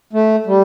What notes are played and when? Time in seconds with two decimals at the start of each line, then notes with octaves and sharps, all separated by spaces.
0.13 A3
0.46 G3